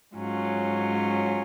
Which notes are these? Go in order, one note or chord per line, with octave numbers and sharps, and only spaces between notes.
G#2 F#3 C#4 F4